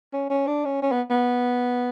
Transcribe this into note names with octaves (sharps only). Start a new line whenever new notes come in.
C#4
C#4
D4
C#4
C#4
B3
B3